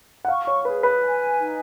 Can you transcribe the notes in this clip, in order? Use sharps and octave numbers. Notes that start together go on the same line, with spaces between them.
F#5
F5 C#6
C#5
G#4 B4
B4
G#5
D#4